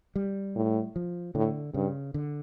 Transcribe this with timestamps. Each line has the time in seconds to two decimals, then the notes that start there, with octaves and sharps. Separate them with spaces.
0.16 G3
0.56 A2
0.96 F3
1.35 A2 D3
1.74 G2 C#3
2.14 D3